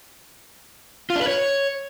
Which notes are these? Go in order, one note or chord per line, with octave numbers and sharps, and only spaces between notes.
F4
D4
B4
C#5